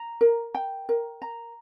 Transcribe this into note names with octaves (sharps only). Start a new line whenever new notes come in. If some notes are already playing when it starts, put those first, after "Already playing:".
Already playing: A#5
A#4
G5
A#4
A#5